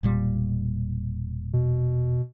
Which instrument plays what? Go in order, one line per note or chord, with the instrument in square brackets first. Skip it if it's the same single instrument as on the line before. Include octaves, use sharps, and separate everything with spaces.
[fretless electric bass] E1 A#2 G3
[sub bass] B2